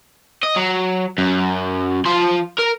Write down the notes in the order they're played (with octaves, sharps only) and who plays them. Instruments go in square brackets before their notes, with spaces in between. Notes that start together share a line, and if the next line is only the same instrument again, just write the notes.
[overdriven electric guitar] D#5
F#3
F#2
F3 C6
A#4